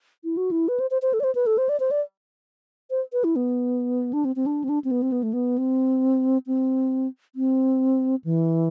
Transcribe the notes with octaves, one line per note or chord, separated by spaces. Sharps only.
E4
F#4
E4
B4
C5
C5
C5
A4
D5
C5
B4
A4
C5
D5
C5
D5
C5
B4
E4
B3
D4
C4
C4
D4
C4
D4
C4
B3
C4
B3
A3
B3
C4
C4
C4
E3